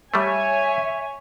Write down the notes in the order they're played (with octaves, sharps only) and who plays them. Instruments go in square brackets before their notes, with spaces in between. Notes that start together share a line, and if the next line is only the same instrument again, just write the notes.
[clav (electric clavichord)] G3 A3 [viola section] C#5 G#5 [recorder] E5